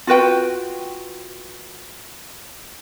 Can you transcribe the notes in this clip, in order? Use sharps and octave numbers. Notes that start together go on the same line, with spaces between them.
F4 F#4 B4 G5